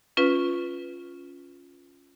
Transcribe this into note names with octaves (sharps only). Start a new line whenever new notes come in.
C#4 F4 B4